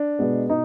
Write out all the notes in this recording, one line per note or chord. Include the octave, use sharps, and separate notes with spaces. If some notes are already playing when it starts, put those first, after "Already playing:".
Already playing: D4
B2 G#3 B3
B2 D#4